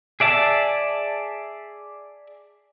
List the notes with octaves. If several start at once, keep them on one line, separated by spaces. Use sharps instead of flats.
G#4 D5 E5 A5